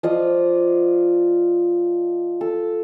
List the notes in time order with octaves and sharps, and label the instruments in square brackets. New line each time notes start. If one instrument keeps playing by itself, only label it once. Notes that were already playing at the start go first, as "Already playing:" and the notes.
[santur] F3 F4 D5 D#5
A4